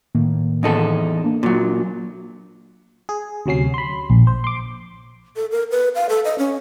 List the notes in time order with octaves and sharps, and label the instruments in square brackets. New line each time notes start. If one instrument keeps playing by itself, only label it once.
[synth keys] A2 D#3 A#3
[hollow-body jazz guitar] E2 D#4 A4
[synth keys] A#3 D4
[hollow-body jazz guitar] A#2 F#3
[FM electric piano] G#4
D2 C3 F#3 C#4 C7
B5 C6
A#1
C5
C6 D6
[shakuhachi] A4
A#4
B4
F5
A4
D#5
C#4